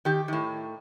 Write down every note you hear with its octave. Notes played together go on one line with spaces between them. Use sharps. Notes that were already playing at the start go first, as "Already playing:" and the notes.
D#3 G4
A2 D#3